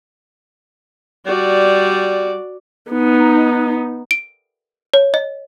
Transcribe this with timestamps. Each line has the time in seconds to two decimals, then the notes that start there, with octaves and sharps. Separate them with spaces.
1.26 G3 F#4 D5
2.91 B3 D#4
4.11 D7
4.94 C#5
5.14 D#5